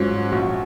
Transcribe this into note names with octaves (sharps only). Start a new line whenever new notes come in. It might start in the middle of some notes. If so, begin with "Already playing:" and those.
Already playing: G#2 F#3 C#4 F4
A#1 F#4